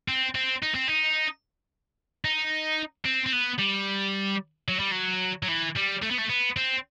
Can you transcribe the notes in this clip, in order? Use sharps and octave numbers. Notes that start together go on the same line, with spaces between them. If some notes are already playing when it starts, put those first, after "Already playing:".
C4
C4
D#4
C4
D#4
D#4
C4
C4
B3
G3
F#3
G3
F#3
F#3
E3
G3
A3
B3
A3
B3
C4